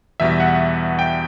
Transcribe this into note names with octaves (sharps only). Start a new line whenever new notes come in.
E2 B2 G3 E5
F#5
G5